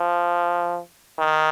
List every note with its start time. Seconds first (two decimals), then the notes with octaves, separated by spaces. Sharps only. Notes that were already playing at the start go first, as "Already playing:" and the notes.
Already playing: F3
1.19 D#3